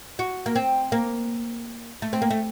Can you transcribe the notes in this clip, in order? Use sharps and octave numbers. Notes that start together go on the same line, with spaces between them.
F#4
A#3
C4
A#3
A3
C4
A#3
A3